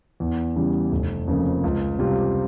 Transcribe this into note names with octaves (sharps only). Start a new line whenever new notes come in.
E2
C#3 E3 G3
F1
F2 C#3 F3 A#3
C#2
C3 G3 C4 F4